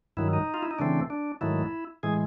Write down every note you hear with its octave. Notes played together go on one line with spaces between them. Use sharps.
G2 D#3 F#3 E4
D#4
F4
E4
D#4
C#3 E3 A3 C4 D4
D4
G#2 D#3 F#3 A3 E4
A2 E3 G#3 G#4